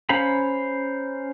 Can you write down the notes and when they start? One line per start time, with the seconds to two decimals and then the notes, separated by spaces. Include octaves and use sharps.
0.09 C#4 C5 F5 A#5 B5